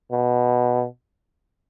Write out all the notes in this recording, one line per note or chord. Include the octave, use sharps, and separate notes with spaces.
B2